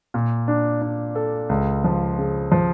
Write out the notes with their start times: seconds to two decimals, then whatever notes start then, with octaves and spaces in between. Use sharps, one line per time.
0.14 A#2
0.48 D4
0.82 D4
1.15 A4
1.49 C#2
1.84 F3
2.19 C#3
2.52 F3